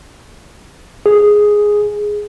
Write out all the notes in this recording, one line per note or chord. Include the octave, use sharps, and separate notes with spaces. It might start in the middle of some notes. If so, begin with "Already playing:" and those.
G#4